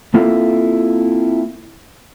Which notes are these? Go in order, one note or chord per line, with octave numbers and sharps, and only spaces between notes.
A#3 C4 E4 F4 A4